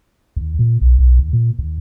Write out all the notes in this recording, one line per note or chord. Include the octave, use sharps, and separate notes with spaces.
D#2
A#2
B1
B1
D#2
A#2
D#2